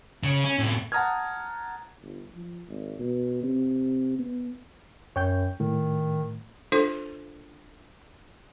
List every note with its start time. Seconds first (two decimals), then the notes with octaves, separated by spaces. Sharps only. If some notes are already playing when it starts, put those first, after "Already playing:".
0.24 C#3
0.44 C#4
0.59 A2 C3
0.92 F#5 A5 A#5 D#6 F6 G#6
2.03 G1
2.34 F3
2.68 G#1
2.99 B2
3.43 C3
4.19 B3
5.16 F#2 C#5 G5 G6
5.60 A2 D#3
6.72 D4 F4 A4 C5